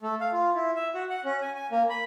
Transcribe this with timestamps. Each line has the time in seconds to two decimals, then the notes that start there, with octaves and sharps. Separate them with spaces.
0.02 A3
0.21 F5
0.32 F4
0.55 E4
0.76 E5
0.95 F#4
1.10 F#5
1.25 C#4
1.42 G#5
1.55 G#5
1.71 A#3
1.90 B5